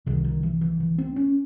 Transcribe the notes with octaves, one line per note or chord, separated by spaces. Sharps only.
C2 C3 D#3
D#3
E3
E3
E3
C4
C#4